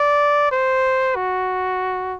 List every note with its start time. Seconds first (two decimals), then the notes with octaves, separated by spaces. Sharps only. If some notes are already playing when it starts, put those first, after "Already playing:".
Already playing: D5
0.51 C5
1.16 F#4